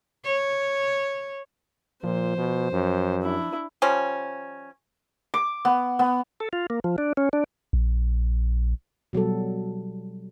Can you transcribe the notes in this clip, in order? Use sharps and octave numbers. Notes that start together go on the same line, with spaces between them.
C#5
A#2 F3 C5
B2
F#2
D4 E4
F3 G3 C#4
D6
B3
B3
A4
F4
A#3
F3
D4
C#4
D4
A#1
B2 F#3 G3 A4